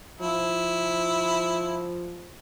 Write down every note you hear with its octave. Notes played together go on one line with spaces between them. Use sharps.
F3 E4